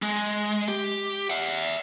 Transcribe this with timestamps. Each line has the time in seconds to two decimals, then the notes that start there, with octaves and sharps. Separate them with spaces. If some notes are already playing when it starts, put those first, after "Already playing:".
0.02 G#3
0.68 G4
1.30 E5 F#5